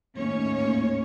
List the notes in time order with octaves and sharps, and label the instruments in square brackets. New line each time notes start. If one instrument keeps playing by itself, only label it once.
[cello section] D#2 A2 C#4 C#5